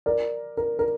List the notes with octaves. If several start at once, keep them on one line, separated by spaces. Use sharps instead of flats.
A#4 D5
A#4
A#4